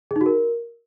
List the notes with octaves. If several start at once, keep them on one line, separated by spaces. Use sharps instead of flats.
G#4
D#4
F#4
A#4